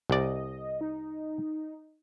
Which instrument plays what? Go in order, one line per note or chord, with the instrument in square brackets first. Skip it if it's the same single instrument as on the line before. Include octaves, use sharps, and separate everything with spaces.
[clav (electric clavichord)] C2 D5 [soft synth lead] D#5
[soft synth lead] D#4